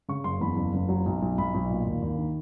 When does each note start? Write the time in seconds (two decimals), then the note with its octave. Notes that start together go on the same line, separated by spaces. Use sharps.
0.08 C#3 C#6
0.24 F#1 C6
0.40 E2 B5
0.57 F#1
0.74 F#1
0.89 F#3
1.06 B1
1.22 B1
1.38 B1 B5
1.54 B1
1.69 A#2
1.86 D#2
2.02 D#2
2.18 D#3